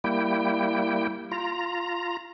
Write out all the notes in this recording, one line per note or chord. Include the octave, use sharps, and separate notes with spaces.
G3 A#3 E4 G5
F4 A#5